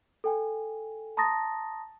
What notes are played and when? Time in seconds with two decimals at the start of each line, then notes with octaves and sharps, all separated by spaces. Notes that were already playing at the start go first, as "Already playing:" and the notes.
0.24 A4 G5 G#5
1.17 A5 A#5 C6 D#6 A6 A#6